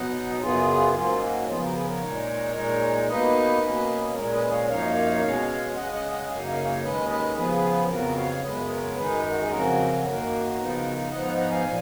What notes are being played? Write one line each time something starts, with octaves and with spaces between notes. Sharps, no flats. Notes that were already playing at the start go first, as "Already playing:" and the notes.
Already playing: B2 F#3 B3 D#4 D#5 F#5
F#2 C#3 F#3 B3 F4 G#4
G#2 F#3 A#3 C#4 F4
G#4
F#4
C#3 F3 B3 F4 G#4
F#4 A#4
G#4 B4
A#4 C#5
A#2 G#3 D#4
A#2 G#3 D#4
B2 A#3 D#4 B4 D#5
B2 A#3 C#4
A#2 G#3 C#4 A#4 C#5
B4 D#5
C#5 F5
F#2 F3 A#3 D#4 C#5 F5
B2 G#3 C#4
C#3 G#3 C#4 D#5 F#5
D#5 F#5
D#5 F#5
F#2 C#3 F#3 A#3 D#4 F5 G#5
F5 G#5
C#5 F5
D#2 D#3 G#3 C#4 B4 D#5
B4 D#5
C#3 F3 B3 G#4 B4
F2 C#3 F#3 B3 F#4 A#4
C#5 F5
F#2 C#3 G#3 B3 B4 D#5
A#4 C#5
F#2 D#3 G#3 D#4 G#4 B4
F#4
G#4
F2 C#3 F#3 C#4 F#4 A#4
F#2 D#3 A#3
C#3 F3 B3 D#4
G#2 F3 B3 D#4 D#5 F#5
F#5 A#5
F#5 A#5
F5 G#5
A#2 F3